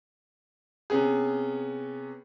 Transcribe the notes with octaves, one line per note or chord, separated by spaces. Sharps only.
C3 B3 C#4 G#4